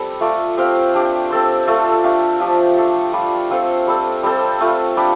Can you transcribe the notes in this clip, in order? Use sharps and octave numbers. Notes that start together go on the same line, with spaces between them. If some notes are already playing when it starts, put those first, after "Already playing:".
Already playing: G3 C4 A4
A3 F4 D5
C4 G4 C5 F5
D4 G4 D5
C4 A4 C5
A3 D4 F4 A4
A3 D4 G4 F5
F3 D4 G4
A3 D4 A4
G3 F4 D5
C4 F4 A4 C5
G3 C4 A4
G3 C4 A4 C5
A3 F4 A4 F5
G3 D4 G4 D5